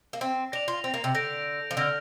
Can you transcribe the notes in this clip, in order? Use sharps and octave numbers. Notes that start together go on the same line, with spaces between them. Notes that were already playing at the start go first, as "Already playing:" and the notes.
A#3
C4
D4 A#6 F7
F4
C4
A#3
C3
D3 G6 A#6 D7
F3
D3 F6 A#6 F7